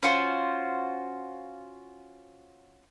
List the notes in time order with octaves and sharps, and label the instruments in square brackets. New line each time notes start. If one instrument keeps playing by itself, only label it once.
[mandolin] C#4 F4 F#4 C5